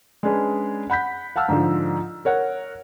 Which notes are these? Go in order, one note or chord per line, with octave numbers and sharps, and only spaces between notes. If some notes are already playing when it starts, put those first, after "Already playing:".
G#3 C#4 D4 G#4 B4
F#5 B5 G6 B6
F5 F#5 A5 E6 F6
G#2 D3 F3
A#4 C#5 F#5